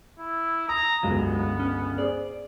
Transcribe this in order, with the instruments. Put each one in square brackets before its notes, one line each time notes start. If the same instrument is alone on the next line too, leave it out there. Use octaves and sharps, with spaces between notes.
[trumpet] E4
[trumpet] A#5 [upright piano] D#6
[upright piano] G1 C#2 F5 [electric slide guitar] F#3 G#3 [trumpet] B3
[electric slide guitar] C#4
[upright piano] G#4 C5 [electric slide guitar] D5